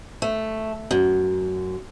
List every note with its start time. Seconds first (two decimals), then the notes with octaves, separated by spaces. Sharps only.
0.22 A3
0.91 F#2